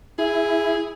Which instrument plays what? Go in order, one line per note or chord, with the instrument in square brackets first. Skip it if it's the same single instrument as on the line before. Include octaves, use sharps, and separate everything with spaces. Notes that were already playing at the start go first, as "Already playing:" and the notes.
[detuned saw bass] E4 [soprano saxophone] G#4